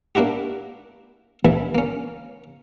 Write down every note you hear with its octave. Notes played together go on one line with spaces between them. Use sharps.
A#3 D4 E4 F#4 G4
A1 A#2 E3 E4 B5
A#3 C#4